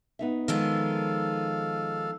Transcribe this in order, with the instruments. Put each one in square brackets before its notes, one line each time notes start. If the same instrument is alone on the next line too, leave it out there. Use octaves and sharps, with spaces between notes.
[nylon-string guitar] B3 D#4 E5
[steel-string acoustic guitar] D#3 F3 G#3 [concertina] A4 F5